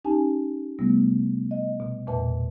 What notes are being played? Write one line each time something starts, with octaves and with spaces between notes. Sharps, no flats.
C#4 D#4 G4 G#5 A5
C3 G3 A3 B3
D#5
B2
E2 A#2 B4 E5 A5